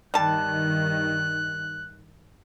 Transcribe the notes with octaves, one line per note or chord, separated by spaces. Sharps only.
G2 D#3 G3 A5 F#6